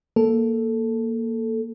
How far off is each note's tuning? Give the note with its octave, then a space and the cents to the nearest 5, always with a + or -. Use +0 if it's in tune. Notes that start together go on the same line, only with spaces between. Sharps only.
A#3 +0 A4 +0